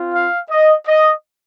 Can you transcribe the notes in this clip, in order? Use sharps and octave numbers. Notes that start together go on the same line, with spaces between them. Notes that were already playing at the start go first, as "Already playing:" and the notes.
Already playing: C4 F4
F5
D#5
D#5